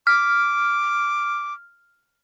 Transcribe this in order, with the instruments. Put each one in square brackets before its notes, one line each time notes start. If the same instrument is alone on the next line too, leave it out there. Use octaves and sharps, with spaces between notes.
[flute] D6 [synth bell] F6